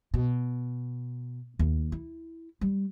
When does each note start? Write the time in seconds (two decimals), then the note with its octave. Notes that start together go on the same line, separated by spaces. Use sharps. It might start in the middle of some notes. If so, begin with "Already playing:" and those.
0.14 B2
1.59 D#2
1.92 E4
2.61 G3